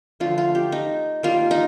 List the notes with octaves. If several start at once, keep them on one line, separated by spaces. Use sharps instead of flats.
D3 F3 A3 F4
F4
G4
D#4
D#3 G3 A#3 F4
D#4